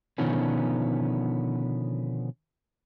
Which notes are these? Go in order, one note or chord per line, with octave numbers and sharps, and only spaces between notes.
B2 D3 D#3 F3 B3 C#4